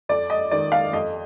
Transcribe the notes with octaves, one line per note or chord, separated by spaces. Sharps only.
F2 D5
D#5
D#3 D5
F5
F2 D#5